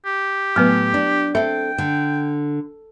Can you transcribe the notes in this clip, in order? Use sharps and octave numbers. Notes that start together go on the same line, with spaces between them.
G4
A2 F#3 B3 B4
D4
C4 A4 E5 G5
D3